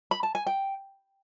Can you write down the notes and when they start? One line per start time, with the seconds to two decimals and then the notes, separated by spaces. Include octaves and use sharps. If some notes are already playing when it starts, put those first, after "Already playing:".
0.11 B5
0.23 A5
0.35 G#5
0.47 G5